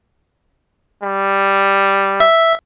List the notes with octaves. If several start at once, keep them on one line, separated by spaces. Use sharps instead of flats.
G3
E5